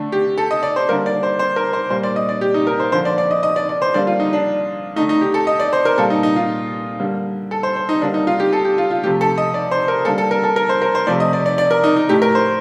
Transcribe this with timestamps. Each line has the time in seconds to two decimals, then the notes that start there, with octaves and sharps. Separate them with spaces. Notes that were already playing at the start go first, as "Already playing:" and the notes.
Already playing: D3 A3
0.12 G4
0.38 A4
0.51 D#5
0.63 D5
0.76 C5
0.88 D3 G3 A#3 A#4
1.06 D5
1.23 C5
1.39 C5
1.56 A#4
1.73 C5
1.90 A#2 G3 A#3 C5
2.03 D5
2.16 D#5
2.29 D5
2.41 G4
2.54 D#4
2.67 A#4
2.80 C5
2.92 D3 F3 A#3 C5
3.05 D5
3.18 D5
3.31 D#5
3.43 D#5
3.56 D5
3.69 D5
3.82 C5
3.94 D3 G3 A#3 D5
4.07 F4
4.20 D#4
4.33 D4
4.96 D3 A3 D#4
5.09 D#4
5.21 G4
5.34 A4
5.47 D#5
5.60 D5
5.73 C5
5.85 A#4
5.98 A#2 G3 A#3 A4
6.10 D#4
6.23 D#4
6.36 F4
7.00 D3 G3 A#3
7.51 A4
7.63 C5
7.76 C5
7.89 D#4
8.01 D3 G3 A#3 D4
8.14 D#4
8.27 F4
8.40 G4
8.53 A4
8.65 G4
8.78 F4
8.91 F4
9.04 C3 F3 A3 G4
9.21 A4
9.38 D#5
9.54 D5
9.71 C5
9.88 A#4
10.05 D3 G3 A#3 A4
10.18 A4
10.31 A#4
10.44 A4
10.56 A#4
10.69 C5
10.82 A#4
10.95 C5
11.07 C3 F3 A3 D5
11.20 D#5
11.33 D5
11.46 D5
11.58 D5
11.71 A#4
11.84 D#4
11.96 D#4
12.09 A2 A3 G4
12.22 A#4
12.35 C5